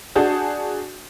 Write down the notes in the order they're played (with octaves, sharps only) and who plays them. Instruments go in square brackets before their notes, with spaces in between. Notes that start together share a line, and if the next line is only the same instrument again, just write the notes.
[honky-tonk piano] D4 F#4 G#4 A5 G6